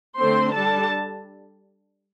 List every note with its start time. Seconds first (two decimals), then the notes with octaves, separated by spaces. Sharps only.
0.17 D3 A3 C4 C5 C6
0.53 G3 D4 A4 A5